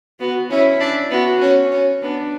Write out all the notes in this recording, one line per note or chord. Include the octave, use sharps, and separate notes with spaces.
B3 F#4
C#4 E4
D4
B3 F#4
C#4
C#4
B3 D4